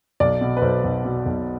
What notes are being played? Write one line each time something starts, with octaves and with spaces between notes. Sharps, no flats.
B1 D5
B2
B4
B1 C5
B1
B2
B1